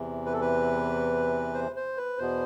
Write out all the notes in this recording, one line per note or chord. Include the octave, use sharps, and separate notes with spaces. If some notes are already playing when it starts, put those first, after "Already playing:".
Already playing: E2 C3 E3
B4
A4
B4
C5
C5
B4
E2 B2 B3 C5